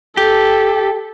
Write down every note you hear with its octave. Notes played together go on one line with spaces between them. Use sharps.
G4 A4